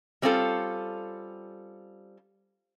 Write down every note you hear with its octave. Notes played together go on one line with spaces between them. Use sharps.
G3 C4 C#4 F4 A4